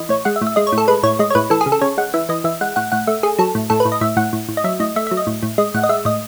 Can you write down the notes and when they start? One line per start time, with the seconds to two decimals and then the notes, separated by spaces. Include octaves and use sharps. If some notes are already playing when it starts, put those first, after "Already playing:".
Already playing: E3 D#5
0.09 A2 C#5
0.25 G#3 F#5
0.36 E5
0.41 A2
0.47 E5
0.56 G#3 D#5
0.67 C#5
0.72 A2
0.78 A4
0.88 G#3 B4
1.03 A2 C#5
1.19 G#3 D#5
1.30 C#5
1.35 A2 B4
1.50 E3 A4
1.61 G#4
1.66 C#3
1.72 A4
1.81 C#3 C#5
1.98 G#3 F#5
2.14 E3 E5
2.29 E3 D#5
2.44 E3 E5
2.61 G#3 F#5
2.76 A2 F#5
2.92 A2 F#5
3.07 A3 E5
3.23 A3 G#4
3.39 F#3 A4
3.55 A2
3.70 A2 A4
3.80 B4
3.85 A2
3.92 D#5
4.01 A2 E5
4.17 A2 F#5
4.33 A2
4.49 A2
4.57 D#5
4.64 F#3 E5
4.80 A2 D#5
4.96 A3 E5
5.07 E5
5.11 F#3
5.17 D#5
5.27 A2
5.43 A2
5.58 G#3 D#5
5.74 A2 F#5
5.84 D#5
5.89 G#3 E5
6.05 A2 D#5